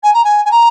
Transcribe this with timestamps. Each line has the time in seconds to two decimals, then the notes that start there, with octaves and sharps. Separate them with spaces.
0.03 G#5
0.14 A#5
0.24 G#5
0.45 G#5
0.51 A#5